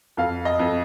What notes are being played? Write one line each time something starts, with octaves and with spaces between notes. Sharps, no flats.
F2 F5
D#5
F2